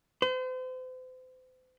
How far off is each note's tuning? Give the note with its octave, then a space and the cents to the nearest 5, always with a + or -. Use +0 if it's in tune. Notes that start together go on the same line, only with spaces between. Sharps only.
C5 -40